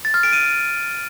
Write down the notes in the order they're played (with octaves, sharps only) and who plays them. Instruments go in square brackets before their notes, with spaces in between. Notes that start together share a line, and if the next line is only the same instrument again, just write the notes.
[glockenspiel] A6
F6
D7
D#7